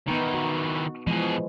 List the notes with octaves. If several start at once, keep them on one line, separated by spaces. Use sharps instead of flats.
D#3 E3 B3 D#4
F#4
B2 E3 F3 G#3 G#4